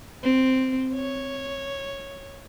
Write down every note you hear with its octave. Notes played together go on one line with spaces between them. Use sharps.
C4
C#5